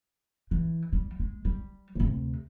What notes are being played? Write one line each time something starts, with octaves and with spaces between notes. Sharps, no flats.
E3
G3
G#3
G3
D2 C3